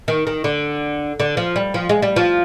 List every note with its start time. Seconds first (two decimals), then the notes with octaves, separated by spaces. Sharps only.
0.08 D#3
0.27 D#3
0.44 D3
1.20 D3
1.37 F3
1.56 G3
1.74 F3
1.89 G#3
2.02 G3
2.16 F3